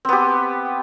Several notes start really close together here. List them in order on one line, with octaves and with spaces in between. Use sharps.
C4 B3 G4